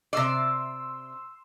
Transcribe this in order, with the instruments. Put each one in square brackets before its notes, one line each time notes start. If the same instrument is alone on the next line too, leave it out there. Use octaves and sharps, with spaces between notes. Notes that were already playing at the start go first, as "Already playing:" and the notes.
[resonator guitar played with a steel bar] C3 D5 [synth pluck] C6 E6